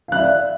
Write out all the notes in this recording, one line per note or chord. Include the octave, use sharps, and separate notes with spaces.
D5 E5 F5 F#6